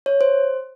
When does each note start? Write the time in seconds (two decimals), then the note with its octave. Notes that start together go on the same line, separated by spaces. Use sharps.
0.06 C#5
0.21 C5